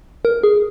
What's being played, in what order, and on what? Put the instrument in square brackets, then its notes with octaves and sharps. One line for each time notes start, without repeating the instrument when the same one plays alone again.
[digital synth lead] A#4
G#4